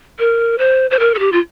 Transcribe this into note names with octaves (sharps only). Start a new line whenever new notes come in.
A#4
C5
C5
A#4
A4
G4
F4